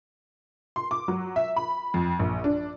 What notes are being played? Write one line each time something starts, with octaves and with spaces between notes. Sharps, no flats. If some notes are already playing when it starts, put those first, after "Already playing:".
C6
D6
F#3
E5
B5
F2
A#1
D4